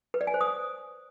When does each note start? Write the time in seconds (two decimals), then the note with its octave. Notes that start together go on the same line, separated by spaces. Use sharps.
0.14 B4
0.21 D5
0.27 G#5
0.34 C5
0.41 D#6